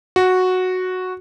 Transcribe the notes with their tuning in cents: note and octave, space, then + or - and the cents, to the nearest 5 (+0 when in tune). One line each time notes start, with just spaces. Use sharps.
F#4 -5